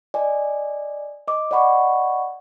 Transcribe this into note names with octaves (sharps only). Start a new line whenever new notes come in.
D5 D#5 G#5
D#5 D6
D5 D#5 F#5 B5 C#6